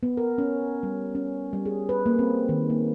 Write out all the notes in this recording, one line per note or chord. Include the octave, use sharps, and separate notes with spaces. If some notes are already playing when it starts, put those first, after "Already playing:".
B3
A#4
C#4
G3
C#4
G3
G#4
B4
A#3
C4
D#3
A#3